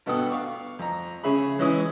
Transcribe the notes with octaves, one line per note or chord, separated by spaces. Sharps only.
G2 B2 B3 A4 G5 D#6
F5 C#6 D6
F2 A#5
C#3 C#4 G#4 E5 B5
E3 G#3 C#4 E4 D#6